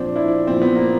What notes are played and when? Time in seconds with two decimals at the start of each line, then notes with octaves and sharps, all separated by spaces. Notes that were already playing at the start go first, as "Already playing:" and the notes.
Already playing: A#2 F3 C4 D4
0.16 D4 E4
0.47 A#2 F3 C4
0.62 B3
0.76 A#3